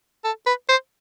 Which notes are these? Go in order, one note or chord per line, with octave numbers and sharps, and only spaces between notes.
A4
B4
C5